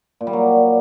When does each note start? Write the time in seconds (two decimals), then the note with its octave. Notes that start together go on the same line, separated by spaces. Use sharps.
0.21 A#2
0.27 G3
0.33 F#3